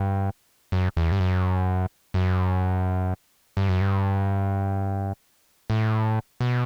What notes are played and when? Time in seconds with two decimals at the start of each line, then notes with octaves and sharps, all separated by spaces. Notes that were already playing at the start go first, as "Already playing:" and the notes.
Already playing: G2
0.72 F#2
0.97 E2
1.12 G2
1.20 F#2
2.14 F#2
3.57 G2
3.69 F#2
3.81 G2
5.70 A2
6.40 B2